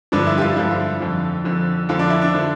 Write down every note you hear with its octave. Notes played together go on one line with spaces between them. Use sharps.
G2 D3 F3 D4
E4
G4
F4
G2 D3 F3 E4
F4
F2 D3 F3
F2 D3 F3
F2 D3 F3 F4
D4
E4
D4
D3 F3